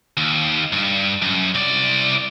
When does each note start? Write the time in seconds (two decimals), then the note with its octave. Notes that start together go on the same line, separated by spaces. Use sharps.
0.17 D#2
0.73 G2
1.22 F#2
1.55 C2 D5